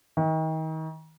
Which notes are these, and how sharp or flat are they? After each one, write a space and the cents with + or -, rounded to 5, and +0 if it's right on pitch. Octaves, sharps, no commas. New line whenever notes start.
D#3 +35